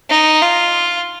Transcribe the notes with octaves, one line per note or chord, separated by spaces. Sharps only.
D#4
F4